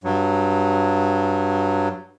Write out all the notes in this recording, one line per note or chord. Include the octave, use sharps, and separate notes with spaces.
G2 F#3